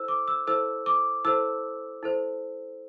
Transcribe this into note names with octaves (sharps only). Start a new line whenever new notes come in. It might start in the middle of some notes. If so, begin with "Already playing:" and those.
Already playing: E4 A4 C5 E6
D6
E6
E4 A4 C5 E6
D6
E4 A4 C5 E6
E4 A4 C5